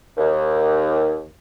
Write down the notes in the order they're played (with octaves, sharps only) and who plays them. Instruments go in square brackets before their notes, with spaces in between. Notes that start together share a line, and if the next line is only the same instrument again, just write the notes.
[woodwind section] D#2